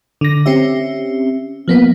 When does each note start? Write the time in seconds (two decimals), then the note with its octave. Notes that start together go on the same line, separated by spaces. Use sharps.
0.21 D3 A#6
0.46 C4 C#4 G4 E5
1.68 F3 A#3 B3